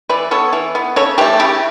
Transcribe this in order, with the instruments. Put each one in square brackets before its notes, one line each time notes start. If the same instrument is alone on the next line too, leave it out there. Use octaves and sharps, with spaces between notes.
[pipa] E3 B4 D5
B3 A4 C#5
E3
B3
C#3 A4 C#5
E3 A3 G4 B4
C#3 E4 G4